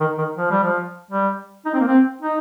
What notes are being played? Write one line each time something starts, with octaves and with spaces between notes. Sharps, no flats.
D#3
D#3
F3
G3
F3
G3
D#4
C4
A#3
C4
D#4